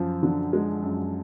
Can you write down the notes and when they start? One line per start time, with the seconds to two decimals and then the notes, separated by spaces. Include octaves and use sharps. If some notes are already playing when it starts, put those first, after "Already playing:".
Already playing: F#2 F3
0.23 D3
0.53 G#3
0.83 F#2